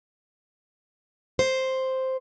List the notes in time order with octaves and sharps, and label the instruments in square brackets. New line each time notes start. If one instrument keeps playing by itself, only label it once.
[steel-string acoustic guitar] C5